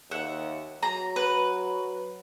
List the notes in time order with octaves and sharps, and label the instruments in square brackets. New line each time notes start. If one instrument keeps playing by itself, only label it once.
[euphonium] D#2 [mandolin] E5 F#5
[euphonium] F#3 [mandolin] A#5
[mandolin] B4